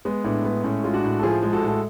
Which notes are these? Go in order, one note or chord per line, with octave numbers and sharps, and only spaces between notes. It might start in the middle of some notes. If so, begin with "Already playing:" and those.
G#3 B3
A2 B3 D4
G#3 B3
A2 C#4
G#3 F4
D4 F#4
A2
A4
F3 F4 G#4
G#3
F#4 A4
A2
F#4 A4